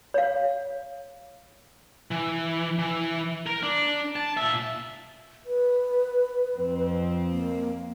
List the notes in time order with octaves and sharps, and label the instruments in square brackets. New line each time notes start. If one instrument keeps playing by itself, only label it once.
[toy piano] C#5 F5
[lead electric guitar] E3
E3
A#4
D4
A5
A#2 E5
[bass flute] B4
[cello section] F2 C4
[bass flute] A#3